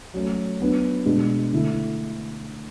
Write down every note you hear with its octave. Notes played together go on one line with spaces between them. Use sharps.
F#3 A3 C#4
F#3 B3 D4
B2 G#3 D4
D3 A3 E4